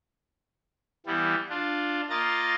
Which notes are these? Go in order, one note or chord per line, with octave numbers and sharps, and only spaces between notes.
E3 G3 B3
D4 F4
A#3 F4 D#5 A#5 A6